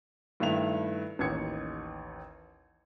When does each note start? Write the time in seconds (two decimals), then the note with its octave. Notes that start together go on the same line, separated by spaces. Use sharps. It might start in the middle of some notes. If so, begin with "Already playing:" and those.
0.40 G2 D#3 A3 E4 F7
1.19 A1 D#2 G#6 C#7